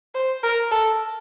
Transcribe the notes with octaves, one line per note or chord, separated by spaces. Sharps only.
C5
A#4
A4